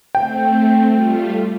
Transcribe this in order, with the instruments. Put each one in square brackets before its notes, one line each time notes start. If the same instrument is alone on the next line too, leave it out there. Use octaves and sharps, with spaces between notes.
[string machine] A3 C4 [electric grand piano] G5
[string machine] G3 A3 F4